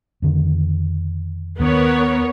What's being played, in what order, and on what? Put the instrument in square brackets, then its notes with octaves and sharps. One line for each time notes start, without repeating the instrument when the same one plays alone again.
[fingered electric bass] F2 D3 D#3
[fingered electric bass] D#2 D#3 D4 [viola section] B3 A#4 C#5